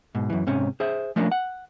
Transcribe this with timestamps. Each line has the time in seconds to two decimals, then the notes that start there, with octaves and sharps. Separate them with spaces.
0.15 G#2 B2
0.30 F#2 E3
0.47 G#2 C3 C#4
0.80 G#4 C5 E5
1.16 F3 A3 A#3 C#4 D4
1.32 F#5